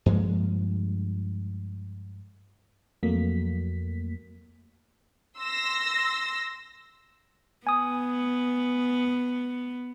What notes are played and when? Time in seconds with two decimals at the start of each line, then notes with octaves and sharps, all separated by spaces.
0.06 G2 F3 G#3 A#3
3.03 F2 F#3 A3 A#3 B6
5.38 C6 E6 A#6
7.67 B3 G#5 D#6